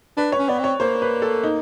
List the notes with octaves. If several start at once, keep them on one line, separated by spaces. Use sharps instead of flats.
D4 B4
C#5
C#4
B3 D5
C4 C#5
A#3 C5
B4
A4
D#4